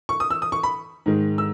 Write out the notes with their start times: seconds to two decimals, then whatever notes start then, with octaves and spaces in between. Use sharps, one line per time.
0.09 C#6
0.20 D#6
0.31 E6
0.42 D#6
0.52 C#6
0.63 B5
1.06 G#2 D#3 G#3
1.38 E6